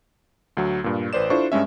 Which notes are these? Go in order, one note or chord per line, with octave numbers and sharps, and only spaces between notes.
D2 F#3
G2 A#2
A1 B4 C5 D5 E7
D4 E4 F4 A4 C5 C#6
G2 G#3 C#4 E5